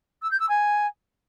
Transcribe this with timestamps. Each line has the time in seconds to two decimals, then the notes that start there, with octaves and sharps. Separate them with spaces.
0.22 E6
0.31 G6
0.40 E6
0.49 G#5